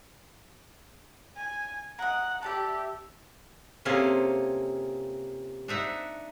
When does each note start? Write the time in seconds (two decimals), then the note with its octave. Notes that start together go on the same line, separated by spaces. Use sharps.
1.36 G#5
1.99 A#4 D#5 F#5
2.42 G4 A4 D5 E5
3.85 C3 A#3 C#4 F4 G#4 A4
5.68 D4 D#4 E5 F#5